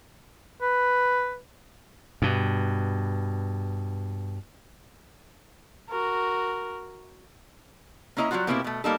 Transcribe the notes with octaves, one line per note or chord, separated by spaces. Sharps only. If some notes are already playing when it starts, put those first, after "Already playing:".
B4
G2 B2
F#4 A#4
A#3 C#4 E4 D#5 A#5
F#3 G3 A#3 F4 F#4
B2 A#3 C4 E4 F#4 G4
B2 A3
G3 A#3 D#4 A4